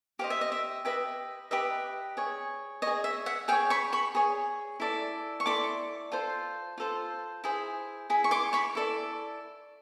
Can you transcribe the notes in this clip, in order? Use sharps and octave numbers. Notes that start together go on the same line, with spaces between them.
G4 C5 D#5 F5
E5
D#5
E5
G4 B4 D#5 E5
G4 B4 D#5 E5
G#4 C#5
G#4 C#5 D#5
E5
E5 F#5
G#4 C#5 F5 G5
B5 C#6
B5 C#6
G#4 C#5
E4 A4 D5
C#6
E4 A4 D5 C6 D6
F4 A4 C5
F4 A4 C5
E4 G#4 C5
E4 G#4
C#6
C6 D6
B5 C#6
E4 A4 D5